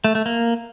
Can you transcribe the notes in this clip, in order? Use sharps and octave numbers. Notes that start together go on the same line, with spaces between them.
A3
A3
A#3